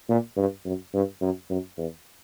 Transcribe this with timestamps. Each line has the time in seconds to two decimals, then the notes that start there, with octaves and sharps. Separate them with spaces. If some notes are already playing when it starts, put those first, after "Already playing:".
0.09 A#2
0.37 G2
0.65 F#2
0.94 G2
1.21 F#2
1.50 F#2
1.77 E2